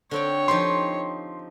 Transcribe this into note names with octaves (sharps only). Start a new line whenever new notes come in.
D3 C4 C#5 G5
F3 D#4 G4 C6